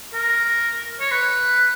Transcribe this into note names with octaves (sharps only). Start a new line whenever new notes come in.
A#4
C#5
B4